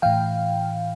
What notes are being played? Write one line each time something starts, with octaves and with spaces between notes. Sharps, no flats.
A2 E3 F5 G5